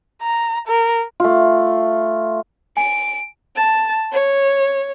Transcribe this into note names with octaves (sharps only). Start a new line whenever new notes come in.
A#5
A#4
A3 F4
G#5 D7
A5
C#5